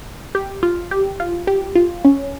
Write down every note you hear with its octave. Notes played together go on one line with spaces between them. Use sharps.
G4
F4
G4
F4
G4
F4
C#4